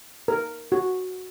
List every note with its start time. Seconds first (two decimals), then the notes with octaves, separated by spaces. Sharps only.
0.28 A#4
0.72 F#4